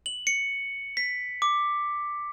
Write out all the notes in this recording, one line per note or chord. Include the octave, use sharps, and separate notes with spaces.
F#7
C#7
B6
D6